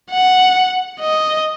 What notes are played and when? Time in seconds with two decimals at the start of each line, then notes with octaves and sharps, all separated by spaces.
0.11 F#5
1.00 D#5